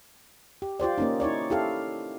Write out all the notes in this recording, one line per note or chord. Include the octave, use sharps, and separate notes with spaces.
G4
F4 G4 C5 D5
A#3 C#4 D#4
D#4 E4 C#5 D5
E4 G4 A4 F5